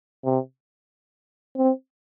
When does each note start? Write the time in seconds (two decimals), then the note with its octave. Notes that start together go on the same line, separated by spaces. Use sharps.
0.25 C3
1.57 C4